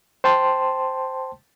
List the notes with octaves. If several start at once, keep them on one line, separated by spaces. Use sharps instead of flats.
C5 G5 A5 C6